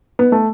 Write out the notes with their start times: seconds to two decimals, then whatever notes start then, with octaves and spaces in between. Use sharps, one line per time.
0.19 B3
0.32 A3